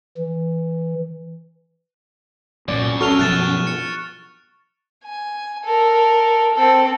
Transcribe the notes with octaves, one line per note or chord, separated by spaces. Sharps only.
E3
C2 F#2 A#2 D5 D7
C#4 F#4 A4 C#6 F6 F7
B2 F3 F#3 F#6 A6 E7
C#7
G#5
A4 A#4
C4 A4